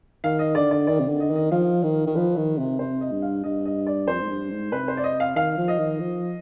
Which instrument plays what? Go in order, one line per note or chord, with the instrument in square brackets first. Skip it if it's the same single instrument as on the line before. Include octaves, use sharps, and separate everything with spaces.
[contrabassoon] D#3 [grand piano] F5
[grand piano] D#5
[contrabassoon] D3 [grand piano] D5
[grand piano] D5
[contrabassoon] D#3 [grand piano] D5
[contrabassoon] C3
D3
[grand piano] D#5
[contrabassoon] D#3
[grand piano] D#5
[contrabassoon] F3 [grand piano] F5
[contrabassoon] D#3
D#3
[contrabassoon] F3 [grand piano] B4
[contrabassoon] D#3
C3
[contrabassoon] C3 [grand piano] C5
[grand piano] D#5
[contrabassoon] G2
[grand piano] F5
[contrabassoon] G2 [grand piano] D#5
[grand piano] D#5
D5
[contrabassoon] F2 [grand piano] C5
[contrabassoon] G#2
G2
G#2
[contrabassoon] C3 [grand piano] B4
[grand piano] C5
D5
D#5
F5
[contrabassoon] D#3 [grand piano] F5
[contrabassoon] F3
[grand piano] D#5
[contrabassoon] D#3
F3